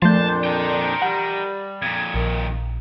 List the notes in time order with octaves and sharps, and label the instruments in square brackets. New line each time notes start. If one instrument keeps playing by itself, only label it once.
[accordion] F2 A#2 D4 [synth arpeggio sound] F3 A3 [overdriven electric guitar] A5 [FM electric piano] C6 G6
[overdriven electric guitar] A#4 G5
[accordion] G3 [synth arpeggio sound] F#5 A#5
[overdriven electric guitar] F2 A#2 [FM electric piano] G#6
[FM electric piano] A#1 [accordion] D#3